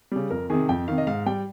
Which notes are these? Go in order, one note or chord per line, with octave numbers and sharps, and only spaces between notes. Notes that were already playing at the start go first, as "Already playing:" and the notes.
C#3 G3
F2 A#4
C3 D#3 G#4
F2 G5
C3 D#3 F5
D#5
G#2 F5
G3 G5